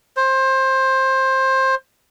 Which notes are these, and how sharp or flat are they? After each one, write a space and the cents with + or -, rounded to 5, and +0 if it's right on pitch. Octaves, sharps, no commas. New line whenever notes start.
C5 +20